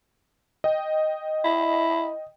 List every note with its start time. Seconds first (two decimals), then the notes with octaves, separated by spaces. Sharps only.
0.64 D#5 G5
1.45 E4